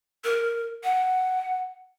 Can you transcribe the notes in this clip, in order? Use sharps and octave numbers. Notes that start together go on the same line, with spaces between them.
A#4
F#5